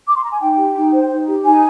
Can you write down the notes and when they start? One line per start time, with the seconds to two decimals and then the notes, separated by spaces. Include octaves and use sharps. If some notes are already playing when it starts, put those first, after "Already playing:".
0.08 D6
0.16 C6
0.24 A#5
0.32 G#5
0.40 D#4 G5
0.58 G4
0.76 D#4
0.93 C5
1.11 D#4
1.27 G4
1.45 D#4 G#5